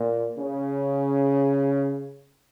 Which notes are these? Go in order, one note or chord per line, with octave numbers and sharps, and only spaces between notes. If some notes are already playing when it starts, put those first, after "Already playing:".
Already playing: A#2
C#3